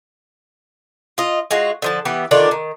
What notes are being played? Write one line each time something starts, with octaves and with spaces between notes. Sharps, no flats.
F4 D#5
G#3 F4 F#4
D3 F3 A5
E3 B3 G4
D3 D#3 D4 F4
D#3